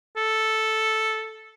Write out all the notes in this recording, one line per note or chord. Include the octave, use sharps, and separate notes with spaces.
A4